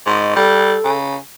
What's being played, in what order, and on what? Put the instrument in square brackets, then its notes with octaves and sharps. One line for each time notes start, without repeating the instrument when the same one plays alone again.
[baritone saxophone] G#2 [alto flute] D#5
[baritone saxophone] G3 [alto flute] A4
[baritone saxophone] C#3